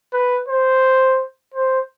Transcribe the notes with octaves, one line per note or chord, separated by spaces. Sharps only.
B4
C5
C5